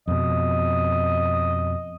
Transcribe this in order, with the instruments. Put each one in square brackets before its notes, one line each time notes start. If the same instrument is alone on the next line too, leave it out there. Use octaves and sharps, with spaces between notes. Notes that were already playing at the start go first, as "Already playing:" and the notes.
[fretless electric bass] F2 B2 [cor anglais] D#5